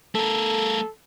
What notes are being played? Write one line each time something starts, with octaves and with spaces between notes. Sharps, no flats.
A3 A4 A#4